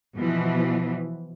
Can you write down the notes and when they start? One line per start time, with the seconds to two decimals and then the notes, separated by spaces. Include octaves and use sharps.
0.17 B2 E3 F3